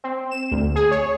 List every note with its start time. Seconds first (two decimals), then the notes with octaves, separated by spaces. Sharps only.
0.04 C4
0.31 E7
0.52 D2
0.76 G#4
0.91 C#5